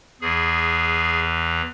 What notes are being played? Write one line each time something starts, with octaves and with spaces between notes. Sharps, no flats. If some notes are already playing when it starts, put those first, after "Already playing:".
E2 E3 G#4